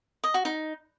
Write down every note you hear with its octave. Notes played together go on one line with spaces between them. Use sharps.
D#5
F#4
D#4